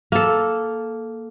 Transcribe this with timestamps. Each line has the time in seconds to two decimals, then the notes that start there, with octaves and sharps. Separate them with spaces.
0.12 A#3 A4